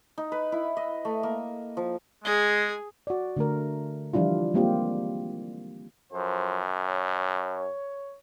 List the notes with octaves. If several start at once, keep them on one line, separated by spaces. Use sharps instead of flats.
D#4
B4
E4
D#5
A3
A#3
F3
G#3 G#4
F#4 D5
D3 A3 A#4
E3 F3 G3 D4 E4 F4
G3 G#3 A#3 C4 F4 G4
F#2 F3 A4 C5
C#5